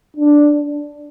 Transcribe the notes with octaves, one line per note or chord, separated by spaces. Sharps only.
D4